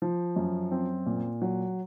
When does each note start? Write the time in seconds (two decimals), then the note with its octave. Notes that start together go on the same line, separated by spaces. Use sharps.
0.02 F3
0.36 F#2
0.71 C4
1.06 A#2
1.42 F#3